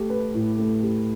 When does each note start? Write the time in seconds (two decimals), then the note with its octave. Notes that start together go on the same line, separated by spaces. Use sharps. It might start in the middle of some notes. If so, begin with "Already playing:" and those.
Already playing: A3 G4
0.10 B4
0.34 A2
0.59 A3
0.83 G4